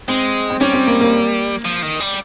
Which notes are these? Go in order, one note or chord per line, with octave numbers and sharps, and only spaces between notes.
G#3 C4
C4
G3 C#4
C4
A#3
A#3
F3
D#3
G3